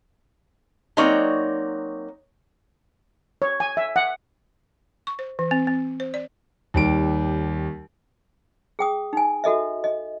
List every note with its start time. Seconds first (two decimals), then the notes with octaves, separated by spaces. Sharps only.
0.97 F#3 A#3 C4 D#4 C#5 D5
3.42 C#5
3.60 G#5
3.77 E5
3.96 F#5
5.07 C#6
5.19 C5
5.39 E3
5.51 C4
5.67 C4
6.00 C5
6.14 D5
6.74 D#2 G3 D7
8.79 G#4 G5 D#6
9.13 D#4 G#5
9.44 F#4 A4 D#5 E5
9.84 D#5